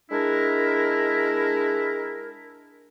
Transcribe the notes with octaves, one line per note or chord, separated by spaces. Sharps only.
G#3 D4 E4 A#4